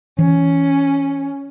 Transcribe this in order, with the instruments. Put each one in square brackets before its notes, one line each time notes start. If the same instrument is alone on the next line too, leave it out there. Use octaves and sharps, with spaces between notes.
[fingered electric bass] E3 [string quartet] C#4